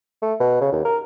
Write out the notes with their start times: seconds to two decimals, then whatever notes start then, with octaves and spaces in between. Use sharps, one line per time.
0.22 A3
0.40 B2
0.61 C#3
0.72 D#2
0.85 A#4